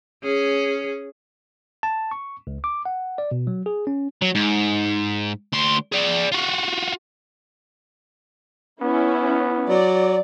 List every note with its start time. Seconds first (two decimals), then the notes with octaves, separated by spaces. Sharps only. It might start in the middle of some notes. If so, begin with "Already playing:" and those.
0.23 C#4 G#4
1.83 A5
2.11 C#6
2.47 C#2
2.64 D6
2.85 F#5
3.18 D5
3.31 B2
3.47 F#3
3.66 G#4
3.87 C#4
4.22 F#3
4.35 G#2
5.52 D2 C6
5.92 G#4 D5
6.32 F4 F#4
8.82 B3 C#4 E4
9.69 F#3 D5